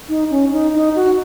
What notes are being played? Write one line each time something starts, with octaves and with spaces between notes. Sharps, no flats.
D#4
C#4
D#4
D#4
F#4